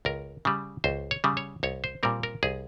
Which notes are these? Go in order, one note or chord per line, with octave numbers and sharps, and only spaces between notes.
C#2 A#4
C#3 G3
C#2 C5
C#5
C#3 G3
C#5
C2 C#5
C5
A#2 G3 C4 A#4
A#4
C2 G#4